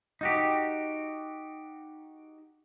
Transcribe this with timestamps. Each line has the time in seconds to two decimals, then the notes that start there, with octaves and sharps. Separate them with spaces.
0.21 D#4 F#4 G4